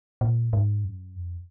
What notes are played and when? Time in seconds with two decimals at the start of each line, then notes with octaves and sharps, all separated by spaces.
0.21 A#2
0.53 G#2
0.85 F#2
1.16 F2